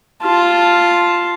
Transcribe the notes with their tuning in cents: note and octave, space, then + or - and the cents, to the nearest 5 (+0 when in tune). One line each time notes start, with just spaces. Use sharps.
F4 +0 A5 +0